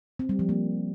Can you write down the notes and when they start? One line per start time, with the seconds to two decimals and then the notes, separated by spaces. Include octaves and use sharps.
0.19 C4
0.29 G3
0.39 F3
0.49 A#3